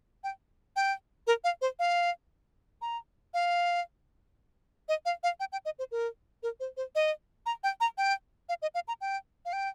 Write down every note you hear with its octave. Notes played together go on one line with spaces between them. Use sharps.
G5
G5
A#4
F5
C5
F5
A#5
F5
D#5
F5
F5
G5
G5
D#5
C5
A#4
A#4
C5
C5
D#5
A#5
G5
A#5
G5
F5
D#5
F5
A#5
G5
F5
G5